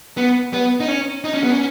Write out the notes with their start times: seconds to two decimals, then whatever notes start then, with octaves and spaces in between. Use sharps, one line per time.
0.17 B3
0.53 B3
0.80 D#4
0.88 C#4
1.24 D#4
1.34 C#4
1.43 B3
1.51 C#4